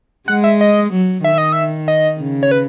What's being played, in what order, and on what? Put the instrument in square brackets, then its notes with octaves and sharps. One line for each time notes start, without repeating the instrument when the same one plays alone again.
[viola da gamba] G#3 [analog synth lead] F#5
[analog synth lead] E5
D#5
[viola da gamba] F#3
[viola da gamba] D#3 [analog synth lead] E5
[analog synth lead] D#5
E5
D#5
[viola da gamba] C#3
[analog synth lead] C#5
B4